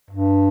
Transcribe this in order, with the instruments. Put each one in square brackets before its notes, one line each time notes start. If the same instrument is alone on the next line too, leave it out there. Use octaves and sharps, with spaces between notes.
[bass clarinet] G2